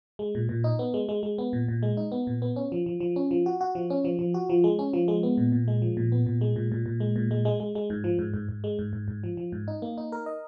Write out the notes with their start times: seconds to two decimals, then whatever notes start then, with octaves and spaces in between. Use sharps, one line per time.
0.19 G#3
0.35 A#2
0.49 A#2
0.64 D#4
0.79 B3
0.94 G#3
1.09 G#3
1.23 G#3
1.38 B3
1.53 A#2
1.68 A#2
1.83 G#3
1.97 D#4
2.12 B3
2.27 A#2
2.42 B3
2.56 C#4
2.72 F3
2.86 F3
3.00 F3
3.16 C#4
3.31 F3
3.46 F#4
3.61 F#4
3.75 F3
3.90 C#4
4.05 F3
4.19 F3
4.34 F#4
4.50 F3
4.64 G#3
4.79 C#4
4.93 F3
5.08 G#3
5.23 B3
5.37 A#2
5.52 A#2
5.68 G#3
5.82 F3
5.97 A#2
6.12 B3
6.26 A#2
6.41 G#3
6.56 A#2
6.72 A#2
6.86 A#2
7.00 G#3
7.16 A#2
7.31 G#3
7.45 G#3
7.60 G#3
7.75 G#3
7.90 G#2
8.04 F3
8.19 G#2
8.34 G#2
8.49 G#2
8.64 G#3
8.79 G#2
8.93 G#2
9.08 G#2
9.24 F3
9.37 F3
9.52 G#2
9.68 D#4
9.82 A#3
9.98 D#4
10.12 A#4
10.26 D#5